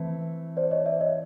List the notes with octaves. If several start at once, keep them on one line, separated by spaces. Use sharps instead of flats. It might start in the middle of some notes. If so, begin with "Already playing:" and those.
Already playing: E3 A3 C4 E4
C5 D5
C#5 D#5
D5 E5
C#5 D#5